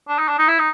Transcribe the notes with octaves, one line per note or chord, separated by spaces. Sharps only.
D4
D#4
D4
D#4
E4
D#4